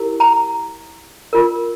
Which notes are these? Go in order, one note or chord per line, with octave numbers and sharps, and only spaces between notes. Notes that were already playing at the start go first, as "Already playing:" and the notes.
Already playing: E4 G4 A#4
A#5
F4 A#4